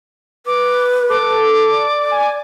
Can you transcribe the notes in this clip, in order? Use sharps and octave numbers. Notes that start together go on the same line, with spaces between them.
B4 D6
A4 D6
D5
G#5